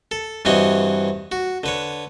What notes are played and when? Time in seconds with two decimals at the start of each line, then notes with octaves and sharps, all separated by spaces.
0.11 A4
0.45 G2 E3 C4 F#4 C#5 D#5
1.32 F#4
1.64 D3 B4 C#5